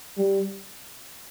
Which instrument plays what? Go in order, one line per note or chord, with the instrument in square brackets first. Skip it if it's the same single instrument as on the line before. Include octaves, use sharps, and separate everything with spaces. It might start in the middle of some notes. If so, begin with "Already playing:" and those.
[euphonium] G3